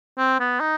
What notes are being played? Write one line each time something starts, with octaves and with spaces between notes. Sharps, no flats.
C4
B3
D#4